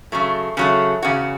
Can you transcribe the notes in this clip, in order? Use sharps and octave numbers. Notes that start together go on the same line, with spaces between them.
C#3 F#3 A3
C#3 F#3 A3
E2 C#3 F#4